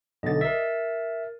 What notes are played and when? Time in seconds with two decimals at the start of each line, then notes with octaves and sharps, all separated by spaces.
0.23 B1 D3 D#5 A6
0.41 A#4 E5 A6